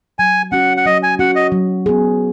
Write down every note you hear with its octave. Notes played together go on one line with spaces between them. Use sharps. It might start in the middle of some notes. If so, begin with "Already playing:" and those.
F#3 G#5
C#4 F#4 F#5
F#5
F#3 D#5
G#5
C#4 F#4 F#5
D#5
F#3
B3 G#4